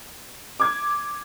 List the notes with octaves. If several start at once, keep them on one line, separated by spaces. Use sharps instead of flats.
D6 G#6